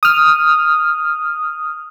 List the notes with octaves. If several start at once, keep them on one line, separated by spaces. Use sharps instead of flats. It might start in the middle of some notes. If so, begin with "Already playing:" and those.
D#6 F6